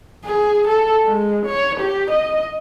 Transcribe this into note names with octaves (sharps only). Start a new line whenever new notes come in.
G#4
A4
G#3
C#5
G4
D#5